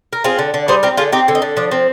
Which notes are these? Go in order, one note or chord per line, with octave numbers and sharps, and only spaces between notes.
A#4
C4 F4 G#4
D3
D3
G3 G#4 C5
C4 G4 A#4
D3 F4 G#4
C4 D#4 G4
D3
D#4
D3
F3 D4
C4